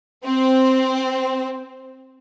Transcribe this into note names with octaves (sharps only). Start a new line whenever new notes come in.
C4